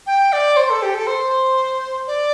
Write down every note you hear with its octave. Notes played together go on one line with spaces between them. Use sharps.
G5
D5
C5
A4
G4
A4
C5
D5